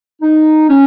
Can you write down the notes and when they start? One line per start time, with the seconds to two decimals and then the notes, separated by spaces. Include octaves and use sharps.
0.22 D#4
0.69 C#4